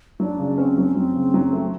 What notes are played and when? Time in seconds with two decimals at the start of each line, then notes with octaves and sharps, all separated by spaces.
0.20 F#3 D4
0.39 C#3
0.58 C4 C#4
0.78 F#3
0.96 F#3 C4
1.15 C#3
1.34 F#3
1.53 A3